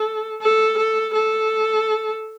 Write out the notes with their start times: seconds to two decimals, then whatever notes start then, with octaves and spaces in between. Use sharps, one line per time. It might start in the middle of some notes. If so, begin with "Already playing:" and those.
Already playing: A4
0.42 A4
0.78 A4
1.15 A4